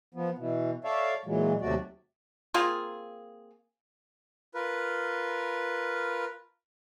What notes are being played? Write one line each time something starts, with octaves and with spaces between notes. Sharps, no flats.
F3 B3
B2 E3
A4 C#5 D5 E5 F5
A#2 E3 F#3 G#3
D#2 C3 F#3 A3 F#4 D5
A#3 C4 F4 G#4
F4 A#4 B4